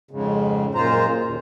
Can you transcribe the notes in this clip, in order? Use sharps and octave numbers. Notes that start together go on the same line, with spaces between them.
F2 G#2 C#3
F#2 A#2 G#3 F4 C5 A#5
D#2 A#2